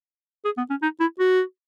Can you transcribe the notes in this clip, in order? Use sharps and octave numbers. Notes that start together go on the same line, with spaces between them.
G#4
B3
C#4
D#4
E4
F#4